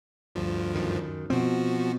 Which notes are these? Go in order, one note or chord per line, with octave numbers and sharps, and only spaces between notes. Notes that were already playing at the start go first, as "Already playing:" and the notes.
D2 G2 F3
F#2 D#3
B2 F3 C4 F#4